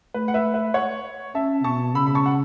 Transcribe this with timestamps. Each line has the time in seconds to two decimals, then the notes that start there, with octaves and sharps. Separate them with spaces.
0.14 A3 B4
0.28 F#5
0.34 B4 E5
0.54 B4 E5
0.74 C#5 F#5
1.35 C#4 E5 A5
1.64 B2 A5 C#6
1.95 C#3 B5 E6
2.06 B5
2.15 A5 C#6
2.26 F#5